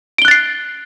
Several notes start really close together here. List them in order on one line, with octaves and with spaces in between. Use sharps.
D7 G7 F#6 A6 C7